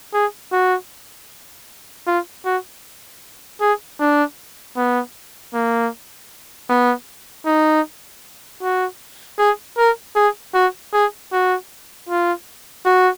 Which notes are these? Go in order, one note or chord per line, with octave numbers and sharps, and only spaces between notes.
G#4
F#4
F4
F#4
G#4
D4
B3
A#3
B3
D#4
F#4
G#4
A#4
G#4
F#4
G#4
F#4
F4
F#4